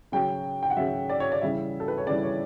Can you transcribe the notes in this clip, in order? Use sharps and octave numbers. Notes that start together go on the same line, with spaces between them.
C#3 F#3 G5
G5
F#5
C#3 F#3 E5
D5
C#5
D5
C#3 E3 G3 E5
A4
B4
C#5
C#3 E3 G3 D5
C#5